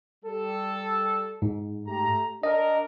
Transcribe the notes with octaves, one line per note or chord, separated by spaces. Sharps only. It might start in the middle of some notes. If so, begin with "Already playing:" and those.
G3 A4
G#2
A3 G4 A#5
D4 A#4 D#5